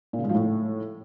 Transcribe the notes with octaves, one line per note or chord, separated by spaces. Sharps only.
A#2
C#3
G#2
F3
A2